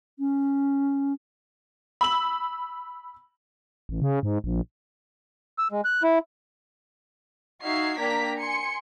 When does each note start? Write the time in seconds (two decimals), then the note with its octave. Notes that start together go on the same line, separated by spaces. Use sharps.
0.19 C#4
2.01 B5 E6 F#7
3.89 A1
4.02 C#3
4.23 G#2
4.44 A#1
5.59 E6
5.72 G#3
5.85 F#6
6.03 E4
7.62 D#4 F#4 E5 F5 G#6 C7
7.99 A#3 D4 G5 A#5 B6
8.39 G#5 C6 C#7